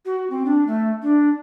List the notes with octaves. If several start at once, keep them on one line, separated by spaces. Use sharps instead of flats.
F#4
C4
D4
A3
D4